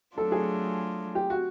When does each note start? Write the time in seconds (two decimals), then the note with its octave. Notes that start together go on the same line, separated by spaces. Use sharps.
0.17 F#3 A3 D4 F4 A4
0.32 G#4
1.15 G4
1.30 F#4